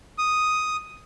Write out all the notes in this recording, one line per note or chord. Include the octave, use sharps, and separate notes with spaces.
D#6